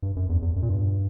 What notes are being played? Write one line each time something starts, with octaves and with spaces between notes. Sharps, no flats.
G2
F#2
E2
E2
F#2
A#2
G2